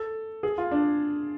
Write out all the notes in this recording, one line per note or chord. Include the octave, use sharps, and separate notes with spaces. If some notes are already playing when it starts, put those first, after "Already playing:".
Already playing: A4
G#4
F4
D4